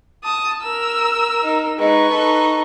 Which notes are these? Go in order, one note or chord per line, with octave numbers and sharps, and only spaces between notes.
A5 D#6
A#4 E6
D#4
G#3 D#4 B4 C#6
D#4 A4